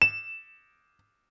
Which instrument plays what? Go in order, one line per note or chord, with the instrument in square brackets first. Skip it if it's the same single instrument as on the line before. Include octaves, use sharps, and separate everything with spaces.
[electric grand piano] E7